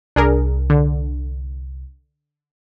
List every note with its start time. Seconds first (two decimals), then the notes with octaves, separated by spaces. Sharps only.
0.16 C2 D4 G#4 A#4
0.70 D3